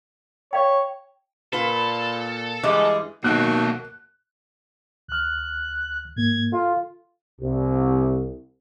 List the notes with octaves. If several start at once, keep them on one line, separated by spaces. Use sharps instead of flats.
C#5 D5 F5 G5
A#2 F4 A4 B4
G2 E3 G3 G#3 D#5
B2 D#3 F#3 A#3 A4 F#6
D2 F6 F#6
G#2 A#3 G#6
F4 A4 F5
C2